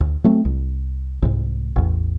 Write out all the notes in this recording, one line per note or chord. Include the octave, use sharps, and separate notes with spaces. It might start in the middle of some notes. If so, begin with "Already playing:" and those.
D2
F#3 A3 C4
C2
C2 G#2
A1 E2